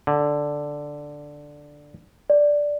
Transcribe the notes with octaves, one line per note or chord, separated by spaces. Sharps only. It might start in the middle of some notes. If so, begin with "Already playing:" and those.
D3
D5